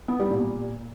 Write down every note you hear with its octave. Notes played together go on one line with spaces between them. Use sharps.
B3
G3
A#2